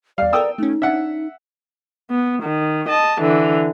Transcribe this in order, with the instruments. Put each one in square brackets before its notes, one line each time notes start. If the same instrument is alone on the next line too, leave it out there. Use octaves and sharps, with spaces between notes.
[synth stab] E2 G3 [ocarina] D5 [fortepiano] F5
[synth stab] B3 A4 A#4 [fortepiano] G5 D#6 E6
[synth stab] A3 C#4 [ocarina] D#4
[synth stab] C#4 D4 [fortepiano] E5 F#5
[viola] B3
D#3
D#5 A5
D3 E3